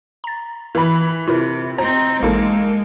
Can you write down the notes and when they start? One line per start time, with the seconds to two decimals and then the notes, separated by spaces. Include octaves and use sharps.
0.24 A#5 A6
0.75 E3 B5
1.28 C3 E4 F4 A#4
1.78 C4 D#4 C5 A#5
2.22 A1 G#3 A#3 D#4 A4